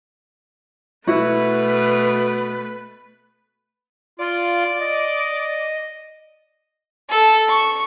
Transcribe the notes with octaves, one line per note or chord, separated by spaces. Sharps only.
B2 A3 E4 F#4 B4
F4 D5
D#5
A4
C#6